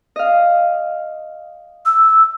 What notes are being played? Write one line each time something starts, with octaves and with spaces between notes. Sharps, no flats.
D#5 F5
E6